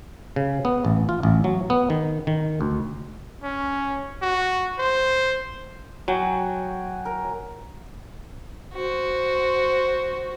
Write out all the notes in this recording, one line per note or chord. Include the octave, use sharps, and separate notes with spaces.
C#3
B3
A1
F4
A1
F#3
B3
D#3
D#3
D2
C#4
F#4
C5
F#3 F#4 G5 G#5
A#4
F#4 C5